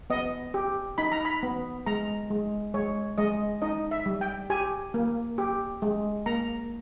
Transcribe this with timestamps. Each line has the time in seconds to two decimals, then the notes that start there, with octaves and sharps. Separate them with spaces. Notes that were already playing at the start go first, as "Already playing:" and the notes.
0.10 B3 D#5
0.54 G4
0.98 D#4 B5
1.12 A#5
1.25 B5
1.43 B3
1.86 G#3 A#5
2.30 G#3
2.74 G#3 C#5
3.18 G#3 D#5
3.62 D#4 D#5
3.91 E5
4.06 G3
4.21 G5
4.50 G4 G#5
4.94 A#3
5.38 G4
5.82 G#3
6.26 A#3 A#5